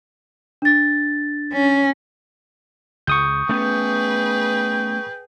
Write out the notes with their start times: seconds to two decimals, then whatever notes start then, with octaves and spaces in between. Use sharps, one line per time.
0.62 D4 A6
1.53 C#4
3.07 C#2 C#6 D#6 G6
3.49 A3 B3 C#4 G#4 B4 G5